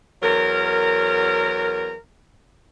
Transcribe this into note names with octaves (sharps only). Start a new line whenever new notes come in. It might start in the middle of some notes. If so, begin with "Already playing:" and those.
E2 F#3 A#4